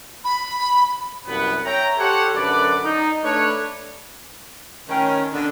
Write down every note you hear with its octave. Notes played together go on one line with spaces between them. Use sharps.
B5
C2 F#2 B3 B4 F#5
C#5 E5 G5 A#5
G4 A4 C5 C#5 F#5
F#2 D3 B4 D5
D#4
A3 D4 B4 C#5
A2 D#3 C#4 G5
B2 D3 D4